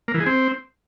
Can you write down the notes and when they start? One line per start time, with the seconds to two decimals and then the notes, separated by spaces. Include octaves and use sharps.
0.08 A#3
0.14 E3
0.20 G#4
0.26 C4